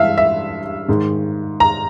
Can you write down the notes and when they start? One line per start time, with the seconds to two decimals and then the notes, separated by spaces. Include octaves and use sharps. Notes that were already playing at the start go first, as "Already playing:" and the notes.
Already playing: G2 E3 G#3 E5 F5
0.18 E5
0.88 G#2 D#3 G#3
1.60 A#5